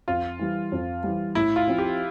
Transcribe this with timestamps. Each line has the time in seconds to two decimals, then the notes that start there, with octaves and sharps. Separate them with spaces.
0.08 F2 F4
0.39 E3 G3
0.72 F2
1.04 E3 G3
1.35 A2 E4
1.56 F4
1.68 F3 C4
1.78 G4